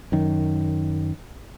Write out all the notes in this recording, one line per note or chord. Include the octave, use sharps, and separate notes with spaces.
F#2 D#3